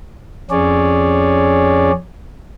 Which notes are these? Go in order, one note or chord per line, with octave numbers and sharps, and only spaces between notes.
F2 C#4 G#4 C#5 D5